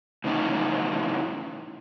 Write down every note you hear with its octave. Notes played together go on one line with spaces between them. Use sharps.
A2 C#3 E3 C#4 D#4